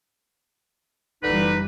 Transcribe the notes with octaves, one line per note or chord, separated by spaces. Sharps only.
F#1 D3 E3 G3 D#4 B4